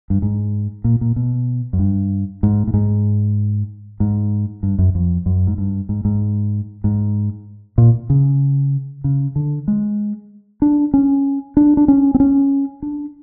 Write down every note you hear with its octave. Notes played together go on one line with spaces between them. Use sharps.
G2
G#2
A#2
A#2
B2
F#2
G2
G#2
A2
G#2
G#2
G2
F#2
F2
F#2
G#2
G2
G#2
G#2
G#2
A#2
C#3
C#3
D3
G#3
D4
C#4
D4
D4
C#4
C4
C#4
D4